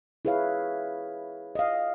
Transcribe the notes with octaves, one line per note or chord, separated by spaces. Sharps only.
E4 G#4 B4 C#5 F5
D#5 F5